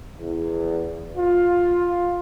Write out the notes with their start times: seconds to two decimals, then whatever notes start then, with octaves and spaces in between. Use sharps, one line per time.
0.19 E2
1.16 F4